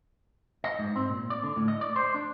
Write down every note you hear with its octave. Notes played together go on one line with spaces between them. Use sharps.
D#5
G#2
C4
A#2
D5
D3
A2
D#5
D5
C5
D4